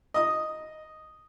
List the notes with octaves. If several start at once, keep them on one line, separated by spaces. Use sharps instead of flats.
D#5 D#6